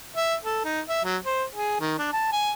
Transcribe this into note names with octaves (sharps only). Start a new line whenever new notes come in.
E5
A4
D#4
E5
F#3
C5
G#4
D#3
D4
A5
G#5